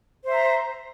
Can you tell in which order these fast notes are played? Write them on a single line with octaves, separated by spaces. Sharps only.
C5 E5 A#5